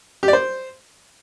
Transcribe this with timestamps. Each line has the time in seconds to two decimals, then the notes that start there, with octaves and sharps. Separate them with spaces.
0.23 G4
0.28 D5
0.33 C5